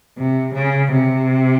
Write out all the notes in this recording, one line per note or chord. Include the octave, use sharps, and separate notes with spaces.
C3
C#3
C3